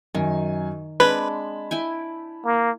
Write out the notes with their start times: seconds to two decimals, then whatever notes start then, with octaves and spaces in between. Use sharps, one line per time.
0.15 F#2 D#3 G#5
1.00 G#3 C4 D4 B4 A5 B5 G#6
1.71 E4 G5 G#5
2.45 A#3